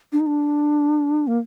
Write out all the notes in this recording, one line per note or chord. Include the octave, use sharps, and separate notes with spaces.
D4
D#4
D4
A#3